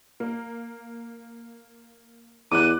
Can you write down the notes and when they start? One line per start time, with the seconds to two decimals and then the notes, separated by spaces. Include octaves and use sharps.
0.20 A#3
2.52 E2 D6 F#6 D#7